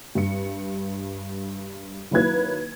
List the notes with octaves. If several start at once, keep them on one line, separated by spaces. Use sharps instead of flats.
G2 C#7
D#3 F#3 A#3 E4 B4 G#6